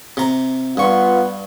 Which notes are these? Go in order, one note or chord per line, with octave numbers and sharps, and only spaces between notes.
C3 A#5
G2 B3 F4 C#6